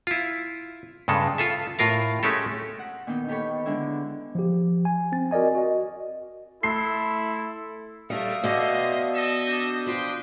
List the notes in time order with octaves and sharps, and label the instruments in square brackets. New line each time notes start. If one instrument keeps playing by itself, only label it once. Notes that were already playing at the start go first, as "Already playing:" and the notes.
[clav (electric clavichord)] E4 F4
G2 C#3 G#3 A4
F4 A4 E5
A2 F4 A#4 F5
G#3 A3 C#4 G4 A4
[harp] F#5
A#2 D#3 B3 D#4
D#3 G4 A4 C#5 B5
D3 G#3 D4 E4
[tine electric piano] F3 G4
G#5
C4 A6
F#4 A#4 D5 D#5 G#5
F#4 D#5
[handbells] A3 A5 C6 [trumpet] E4 [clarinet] A4 [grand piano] C7
[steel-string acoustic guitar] G3 A4 [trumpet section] A3 D4 A#4 [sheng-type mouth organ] E5 F5 D#6
[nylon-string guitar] B2 [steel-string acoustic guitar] B3 D5 F#5 [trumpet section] C5 D#5
[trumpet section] A4 D#5 E5
[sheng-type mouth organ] D4 D#6 G6
[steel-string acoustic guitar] F3 [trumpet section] B4 G5 C6